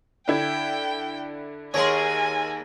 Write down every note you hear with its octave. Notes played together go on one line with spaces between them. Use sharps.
D3 E4 G5 G#6
D#2 G#4 A#4 C#5 G#5 C6